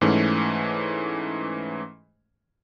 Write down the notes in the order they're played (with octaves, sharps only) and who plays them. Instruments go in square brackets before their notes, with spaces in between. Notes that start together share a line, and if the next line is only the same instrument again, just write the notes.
[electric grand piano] G#2 E3 A3 C#4